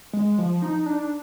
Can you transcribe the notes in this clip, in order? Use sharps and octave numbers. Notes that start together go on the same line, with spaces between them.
G#3
F3
D#4
D4